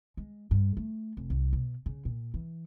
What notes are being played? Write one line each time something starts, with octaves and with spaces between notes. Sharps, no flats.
G#3
G2
A3
F1
C2
B2
C#3
A#2
E3